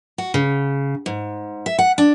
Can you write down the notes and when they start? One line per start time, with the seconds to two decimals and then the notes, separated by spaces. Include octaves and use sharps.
0.18 F#4
0.34 C#3
1.06 G#2
1.66 E5
1.79 F#5
1.98 D4